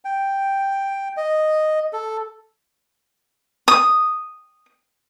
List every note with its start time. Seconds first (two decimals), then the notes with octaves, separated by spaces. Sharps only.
0.05 G5
1.17 D#5
1.93 A4
3.68 D#6